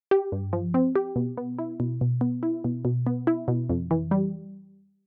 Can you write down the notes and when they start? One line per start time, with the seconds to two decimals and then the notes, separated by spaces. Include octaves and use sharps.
0.11 G4
0.32 G2
0.53 F3
0.74 C4
0.96 G4
1.16 B2
1.37 B3
1.59 E4
1.80 B2
2.01 B2
2.21 B3
2.43 E4
2.64 B2
2.85 B2
3.07 B3
3.27 E4
3.48 B2
3.69 F2
3.91 E3
4.11 G3